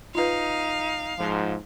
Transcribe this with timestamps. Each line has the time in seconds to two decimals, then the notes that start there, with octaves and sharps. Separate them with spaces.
0.15 D#4 F4 B4 F5
1.19 G#2 F3